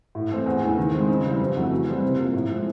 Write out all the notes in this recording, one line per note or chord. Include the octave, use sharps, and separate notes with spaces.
A2
E3 A3 C4
E2
C#3 E3 A3
D#3
G#3 C4
C#3
E3 G3 C4
F2
C#3 F#3 A3
E3
G3 C4
C3
F3 A#3
A2
F3 G#3 C4